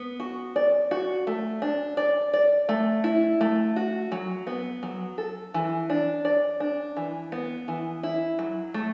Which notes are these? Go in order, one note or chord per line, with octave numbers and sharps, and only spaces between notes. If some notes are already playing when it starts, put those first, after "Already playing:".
Already playing: B3
F#4
D5
F#4
A3
D4
D5
D5
A3
E4
A3
F#4
F#3
B3
F#3
A4
E3
D4
D5
D4
E3
B3
E3
E4
F#3
A3